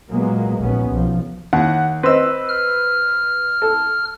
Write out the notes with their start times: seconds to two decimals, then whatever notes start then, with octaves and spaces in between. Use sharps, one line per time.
0.10 A#2 F#3 G#3 A#3 B3
0.59 A#1 D#2 B3 C#4
0.91 B1 F3
1.53 D#2 F#5
2.03 C4 B4 D#5 E6
2.49 F6
3.62 A4